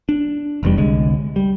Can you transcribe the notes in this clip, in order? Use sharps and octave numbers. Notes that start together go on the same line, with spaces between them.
D4
F1 E2 G3
C2 D3 G#3
G3